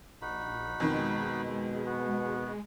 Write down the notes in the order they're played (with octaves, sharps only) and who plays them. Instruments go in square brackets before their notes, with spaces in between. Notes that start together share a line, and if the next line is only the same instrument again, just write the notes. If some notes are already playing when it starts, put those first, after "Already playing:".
[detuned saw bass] A#1 [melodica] D#4 F#4 B5
[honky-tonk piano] F2 D#3 [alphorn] B2 [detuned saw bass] G#3
[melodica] B3 F#4